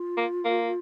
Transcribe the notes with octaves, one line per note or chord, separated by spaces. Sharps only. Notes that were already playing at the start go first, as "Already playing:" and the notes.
Already playing: F4
A#3
A#3